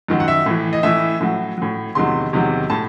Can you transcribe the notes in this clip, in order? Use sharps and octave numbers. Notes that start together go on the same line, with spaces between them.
F#2 D#3 F#3
F#5
E5
A2 E3
D#5
A2 E3 E5
A2 F#3
A2 F#3
E2 C3 D#3 F#3 C6
E2 C3 D#3 F#3
A2 A5